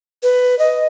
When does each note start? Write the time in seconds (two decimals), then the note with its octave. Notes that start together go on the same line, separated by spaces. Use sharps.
0.23 B4
0.59 D#5